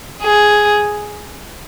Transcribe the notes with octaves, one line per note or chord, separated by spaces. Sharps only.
G#4